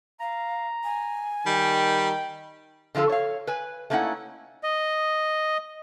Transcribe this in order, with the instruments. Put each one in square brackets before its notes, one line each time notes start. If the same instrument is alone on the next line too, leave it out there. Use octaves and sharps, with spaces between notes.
[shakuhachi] F5 [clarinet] A#5
[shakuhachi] G#5
[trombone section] D#3 [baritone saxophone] G3 [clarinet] G5
[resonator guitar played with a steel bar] D3 F3 F4 F#4 A4
C#5 F5
B4 G#5
A3 A#3 C#4 D#4 E4 F#5
[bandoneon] D#5